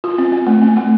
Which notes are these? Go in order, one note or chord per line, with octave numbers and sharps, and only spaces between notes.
F4
C4
C4
A3
C4
A3